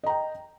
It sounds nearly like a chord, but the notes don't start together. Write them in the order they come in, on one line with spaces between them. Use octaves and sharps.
D#5 A#5 G5